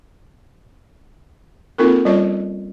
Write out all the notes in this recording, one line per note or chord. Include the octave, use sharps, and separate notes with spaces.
A#3 C4 D#4 F4 A4 A#4
G3 C#4 F4 C#5 D#5